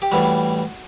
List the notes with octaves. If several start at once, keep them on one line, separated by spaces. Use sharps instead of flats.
G4
A2 E3 G3 F#4